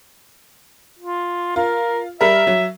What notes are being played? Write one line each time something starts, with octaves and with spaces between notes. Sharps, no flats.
F4
F4 A#4
G3 A#4 E5
F#3